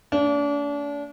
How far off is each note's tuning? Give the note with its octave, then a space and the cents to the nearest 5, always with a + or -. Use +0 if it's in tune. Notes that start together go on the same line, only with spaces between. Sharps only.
A3 +40 D4 -35